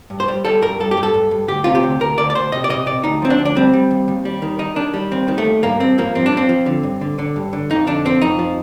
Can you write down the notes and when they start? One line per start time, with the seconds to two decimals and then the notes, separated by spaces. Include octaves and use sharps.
0.10 G2
0.20 C5
0.28 G3
0.45 G3 A4
0.62 G2 A#4
0.80 G2 A4
0.91 G4
0.97 G2
1.03 A4
1.14 G2
1.31 G2
1.48 D2 G4
1.64 C3 F4
1.75 G4
1.83 D2
2.00 D2 A#4
2.18 D2 D5
2.30 D5
2.35 D2 C5
2.52 C3 D#5
2.64 D5
2.70 C3 D#5
2.86 C3 D5
3.04 D2 D#4
3.22 F3 C4
3.30 D4
3.39 D2
3.45 D4
3.55 G3 C4
3.73 G3
3.91 D#2
4.08 D#2
4.25 G3
4.42 D#3
4.59 D#3 D#4
4.76 D#3 D4
4.94 G3
5.11 D#2 C4
5.28 D#3
5.38 A3
5.45 D#2
5.63 G2 A#3
5.80 G2 C4
5.98 F3 A#3
6.15 G2 C4
6.26 D4
6.32 F3 C4
6.49 F3
6.66 D3
6.83 G2
7.01 D3
7.19 D3
7.36 G2
7.53 D3
7.70 F2 D#4
7.87 D3 D4
8.05 F3 C4
8.21 F2 D#4
8.39 F3